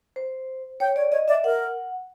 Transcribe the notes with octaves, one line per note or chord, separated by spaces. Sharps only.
C5
C#5 G5
C#5 D5
C#5 D#5
D5 E5
A#4 F#5